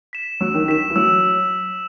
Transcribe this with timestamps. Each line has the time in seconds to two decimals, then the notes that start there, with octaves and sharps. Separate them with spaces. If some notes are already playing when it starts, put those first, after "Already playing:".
0.13 B6 E7
0.41 F#3 E6
0.54 D#3
0.68 D#3 B6 E7
0.90 E3
0.96 F#3 E6